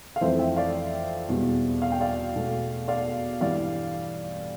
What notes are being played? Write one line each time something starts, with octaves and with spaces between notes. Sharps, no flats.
F5
F2 E3 A3 C5 E5
E5 G5
D5 F5
E2 B2 G3
F5
G5
D5 F5
B2 A3
D5 F5
G2 E3 G3 D5 F5